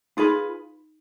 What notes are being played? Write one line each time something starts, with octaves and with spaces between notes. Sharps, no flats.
D#4 F4 G#4 B4